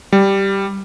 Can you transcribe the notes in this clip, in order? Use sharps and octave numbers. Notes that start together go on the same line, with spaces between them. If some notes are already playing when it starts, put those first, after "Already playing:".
G3